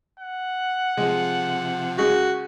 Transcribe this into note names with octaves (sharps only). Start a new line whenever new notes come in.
F#5
C3 F3 G#3
C#3 G#3 F#4